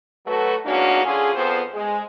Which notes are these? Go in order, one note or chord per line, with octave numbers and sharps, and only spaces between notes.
F#3 A3 F#4 A4 B4
E2 G#2 A#3 C#4 D4 F#4
D3 C#4 F4 G#4
F2 B3 C5
G#3